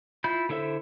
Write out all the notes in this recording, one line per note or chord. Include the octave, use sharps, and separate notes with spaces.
E4 F4 B5 G6
D3 E4 A4 C5 E5